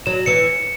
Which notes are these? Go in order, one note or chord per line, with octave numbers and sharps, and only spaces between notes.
F#3 E7
E3 C#7